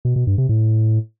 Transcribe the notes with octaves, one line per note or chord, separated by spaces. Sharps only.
B2
B2
G2
C3
A2